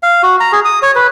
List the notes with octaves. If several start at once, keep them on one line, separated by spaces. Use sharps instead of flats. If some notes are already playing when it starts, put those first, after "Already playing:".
F5
F#4
A#5
G#4
D#6
C#5
B4